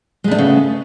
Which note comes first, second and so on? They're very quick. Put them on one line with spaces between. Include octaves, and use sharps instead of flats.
G#3 A3 D4 B3 C#3